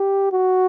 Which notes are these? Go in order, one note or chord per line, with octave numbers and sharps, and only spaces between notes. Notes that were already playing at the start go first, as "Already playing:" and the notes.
Already playing: G4
F#4